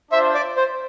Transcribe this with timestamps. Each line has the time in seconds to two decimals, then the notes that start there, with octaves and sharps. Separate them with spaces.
0.12 D4 F4 C5 E5
0.35 D5
0.57 C5